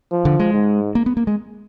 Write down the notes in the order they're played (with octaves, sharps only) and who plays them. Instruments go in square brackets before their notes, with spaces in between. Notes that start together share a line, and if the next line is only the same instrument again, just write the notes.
[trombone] F3
[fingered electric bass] D3
G#3
[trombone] G#2
[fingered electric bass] A#3
B3
A#3
G#3